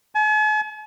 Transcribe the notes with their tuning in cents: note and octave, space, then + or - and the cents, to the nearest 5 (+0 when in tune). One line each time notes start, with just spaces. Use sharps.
G#5 +45